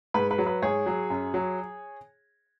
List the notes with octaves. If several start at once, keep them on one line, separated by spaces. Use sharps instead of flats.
G#2 B4
B4
F#3
B4
G#2 G#4 C#5
F#3
F#2
F#3